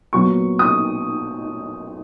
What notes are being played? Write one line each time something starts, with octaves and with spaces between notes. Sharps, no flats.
A#2 F#3 B3 C#6
D#6